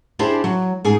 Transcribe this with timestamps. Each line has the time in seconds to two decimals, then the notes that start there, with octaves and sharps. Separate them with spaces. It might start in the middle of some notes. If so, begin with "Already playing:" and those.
0.19 D4 E4 G4 G#4 C5
0.44 F#3
0.85 G#2 G#4 G#5